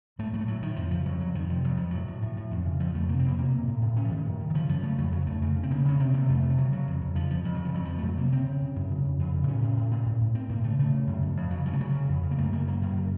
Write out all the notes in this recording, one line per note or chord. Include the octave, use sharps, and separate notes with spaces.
A2 A3
A2 F#3
A3
A2 F#3
A2 D#3
F2 F3
C#3 F3
F2 F#3
F2 F#3
F2 D#3
C3 F3
F2 F#3
F2 F3
A2 F#3
A2
A2
A2
F2
C#3
F2 F3
F2 A3
C3 A#3
C4
F2 A#3
C3 A#3
C3
A2
A2
A2 C#4
F3
A2 D#3
F#2
C#3
D#3
C#3 F3
F#2 F3
C#3 A3
F2 F#3
C#3 F#3
F2 A3
C#3
C#3
C4
C#3 A#3
C#3 C#4
C3 C4
C3 A#3
F2 A3
C3
A3
C#3 F#3
C#3 F#3
F2
F2
C#3 F3
F2 F3
F2 F3
F#3
C#3
F3
F2 F#3
F2 F3
A3
F2 F#3
C3 A#3
C#3 C4
C#3
C#3
F#2
C#3
F2
F2
C#3
A2 C#4
A2
A2
A2
A2
A2
A2 C4
A2 A#3
C#3 A3
C#3 A3
C#3
F#2
F2
F2
C#3 F#3
C#3 F3
A3
C#3 F#3
C#3
F2
C#3
A#3
F#2 A3
C#3 A#3
F#2 A#3
F#2
C#3